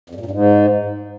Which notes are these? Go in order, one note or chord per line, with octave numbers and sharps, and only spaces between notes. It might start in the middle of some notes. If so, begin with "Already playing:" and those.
F2
G2
A#2
G2
G#2